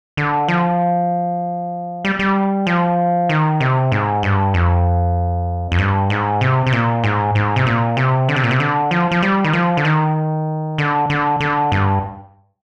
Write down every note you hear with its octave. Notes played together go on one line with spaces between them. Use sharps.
D3
F3
G3
G3
F3
D#3
C3
G#2
G2
F2
F2
G2
G#2
C3
C3
A#2
G#2
G#2
C3
A#2
C3
D3
C3
A#2
C3
D3
F3
F3
G3
D#3
F3
D3
D#3
D3
D3
D3
G2